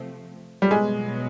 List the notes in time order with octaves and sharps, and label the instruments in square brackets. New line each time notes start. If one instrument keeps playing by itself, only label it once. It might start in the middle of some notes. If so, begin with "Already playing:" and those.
Already playing: [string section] C3 F3 A3 C4
[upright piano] G3
[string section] B2 F#3 B3 [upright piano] G#3